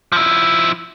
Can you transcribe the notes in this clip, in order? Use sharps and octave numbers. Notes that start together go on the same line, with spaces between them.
F3 E4